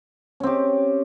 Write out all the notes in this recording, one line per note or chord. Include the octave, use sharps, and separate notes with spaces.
C4 C#4 G4